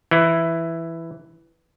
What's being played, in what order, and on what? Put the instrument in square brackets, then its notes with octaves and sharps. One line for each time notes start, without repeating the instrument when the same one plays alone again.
[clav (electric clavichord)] E3 E4